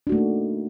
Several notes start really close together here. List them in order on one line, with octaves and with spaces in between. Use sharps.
D4 F#4 A3 A#3 D#4